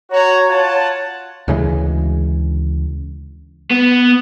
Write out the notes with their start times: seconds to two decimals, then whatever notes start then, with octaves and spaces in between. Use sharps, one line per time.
0.11 F#4 C#5 A#5
0.49 F4 F#5 A5
1.48 D2 C#3 E3 G#3
3.71 B3